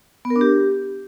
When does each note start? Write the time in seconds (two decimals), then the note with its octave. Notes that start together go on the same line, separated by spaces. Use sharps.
0.25 B3
0.30 A#4
0.36 D4
0.41 G4